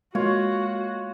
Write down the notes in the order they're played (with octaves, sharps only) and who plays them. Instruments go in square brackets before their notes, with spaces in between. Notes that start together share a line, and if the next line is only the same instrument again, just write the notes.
[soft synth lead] G#3 [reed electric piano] A#3 [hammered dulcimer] F4 C#5 [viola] F#4